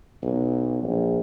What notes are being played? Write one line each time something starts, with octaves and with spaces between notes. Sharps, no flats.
B1
A#1